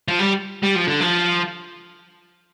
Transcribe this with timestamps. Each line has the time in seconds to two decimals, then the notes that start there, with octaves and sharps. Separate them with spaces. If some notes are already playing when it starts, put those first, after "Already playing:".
0.08 F3
0.19 G3
0.63 G3
0.76 F3
0.88 D3
1.01 F3